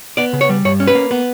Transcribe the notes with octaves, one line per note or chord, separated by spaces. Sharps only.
B3 D5
C#3
C#5
G3
G2 C#5
C#4
B4
A#3
B3